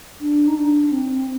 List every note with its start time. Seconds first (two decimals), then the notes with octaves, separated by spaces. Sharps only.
0.21 D4
0.47 D#4
0.56 D4
0.91 C4